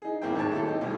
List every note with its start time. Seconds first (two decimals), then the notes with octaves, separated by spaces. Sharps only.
0.02 D#4 G#4
0.22 G#1 A#3 C4 E4 G5
0.35 D#2 G#2 G#3 C#5 A5
0.51 A3 E4 G4 A4
0.66 C4 D#4 G4
0.81 B1 A2 G3